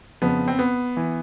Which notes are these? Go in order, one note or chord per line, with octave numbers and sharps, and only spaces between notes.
F2 C#3 F3 B3
C4
B3
E3